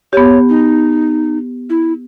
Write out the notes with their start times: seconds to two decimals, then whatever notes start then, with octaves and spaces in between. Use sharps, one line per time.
0.13 B3 G4 C#5
0.49 D#4
1.70 E4